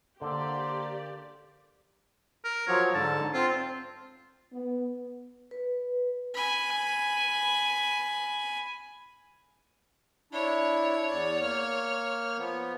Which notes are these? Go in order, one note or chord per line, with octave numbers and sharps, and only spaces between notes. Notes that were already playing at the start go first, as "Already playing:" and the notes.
D3 A#3 G4 C5 D5
A#4
F3 F#3 C#5
G#2 D3 A5
C4 F4
B3
B4
G#5 B5
D4 E4 C#5
E2 D5
A#3 F6
F3 B3